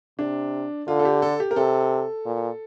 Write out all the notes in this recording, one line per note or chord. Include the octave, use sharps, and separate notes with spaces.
C3 D4
D3 F4
A4
G4
A4
G4
A#4
C3 A4
A#2